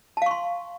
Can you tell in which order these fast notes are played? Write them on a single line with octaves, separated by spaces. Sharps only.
A5 F5 C#6 C6